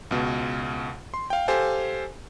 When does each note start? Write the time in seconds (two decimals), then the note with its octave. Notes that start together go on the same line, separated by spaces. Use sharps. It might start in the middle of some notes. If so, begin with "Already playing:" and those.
0.11 C#2 B2
1.14 C6
1.30 F5 G5
1.48 G4 A4 C5 F5 G#5